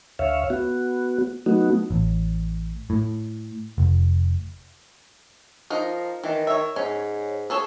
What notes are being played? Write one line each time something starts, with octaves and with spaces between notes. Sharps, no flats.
D2 C#5 E5 F5
B3 F#4
F#3 A3 B3 D#4 F#4
A1
A2
F1
F3 D#4 A#4
D#3 E3
C#5 E5
G#2 C#4
G#4 A4 C#5